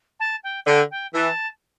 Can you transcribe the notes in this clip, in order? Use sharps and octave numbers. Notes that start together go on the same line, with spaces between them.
A5
G5
D3 G5
G5
E3 A5